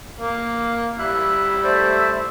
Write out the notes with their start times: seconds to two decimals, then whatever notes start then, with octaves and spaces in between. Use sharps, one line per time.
0.21 A#3
0.99 G3 E4 F#6
1.63 A3 C5 D5